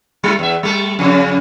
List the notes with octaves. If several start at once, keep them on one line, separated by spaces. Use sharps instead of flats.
G3 E4
E2 E5
G3 A3
F2 C#3